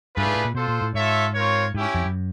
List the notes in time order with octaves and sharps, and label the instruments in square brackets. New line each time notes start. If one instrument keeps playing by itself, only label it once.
[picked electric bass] G2 [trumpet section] A3 D4 F4 G#4 B4
[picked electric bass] G#2
A2
A#2
[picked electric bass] B2 [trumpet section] F4 A4 C5
[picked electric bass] A#2
A2
[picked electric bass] G#2 [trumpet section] F4 A4 C#5 E5
[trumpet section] C4 F4 A#4 C#5
[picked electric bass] G#2 [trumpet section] C#4 E4 G4
[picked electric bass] F2
F#2